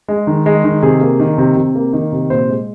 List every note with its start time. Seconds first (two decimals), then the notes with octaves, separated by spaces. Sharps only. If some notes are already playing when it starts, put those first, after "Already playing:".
0.08 G#3
0.27 D#3
0.46 G#3
0.64 D#3
0.83 C3 G#4
1.01 A#3
1.20 D#3
1.38 C3
1.56 C3
1.75 A#3
1.93 D#3
2.12 C3
2.30 A#2 C5
2.49 G#3